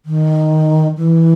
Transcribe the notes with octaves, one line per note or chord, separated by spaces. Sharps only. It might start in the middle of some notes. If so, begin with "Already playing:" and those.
D#3
E3